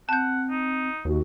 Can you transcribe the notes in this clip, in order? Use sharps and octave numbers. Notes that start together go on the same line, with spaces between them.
C4 F#5 A5 G6
D#4
D#2 F#4